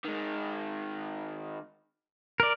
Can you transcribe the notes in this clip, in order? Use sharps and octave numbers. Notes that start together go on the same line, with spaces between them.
D#3 G#3
A#4 D5